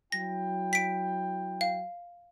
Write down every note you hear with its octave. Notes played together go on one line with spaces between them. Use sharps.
F#3 E4 G5 A#6
B6 D7
F5